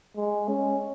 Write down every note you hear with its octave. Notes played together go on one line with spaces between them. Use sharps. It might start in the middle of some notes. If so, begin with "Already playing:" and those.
G#3
C#4